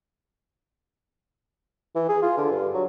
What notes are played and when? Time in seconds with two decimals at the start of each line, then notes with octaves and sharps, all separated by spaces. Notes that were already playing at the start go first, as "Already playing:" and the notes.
1.95 E3
2.09 G#4
2.22 F4
2.37 D3
2.51 G2
2.73 F#3